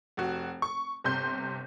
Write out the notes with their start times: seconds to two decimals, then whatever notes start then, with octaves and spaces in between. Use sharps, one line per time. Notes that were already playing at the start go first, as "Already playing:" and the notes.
0.17 F1 F#4
0.62 C#6
1.04 G1 C3 C6 G6